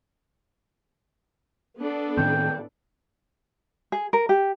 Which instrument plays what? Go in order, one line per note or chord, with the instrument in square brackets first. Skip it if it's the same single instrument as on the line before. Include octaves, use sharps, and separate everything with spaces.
[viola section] B3 D4 A4
[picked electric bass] A2 D#3 C4 [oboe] G5
[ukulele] G#4
A#4
G4